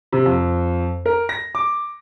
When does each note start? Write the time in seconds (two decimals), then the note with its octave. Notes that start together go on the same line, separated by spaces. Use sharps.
0.13 C3
0.26 F2
1.06 A#4
1.29 A#6
1.55 D6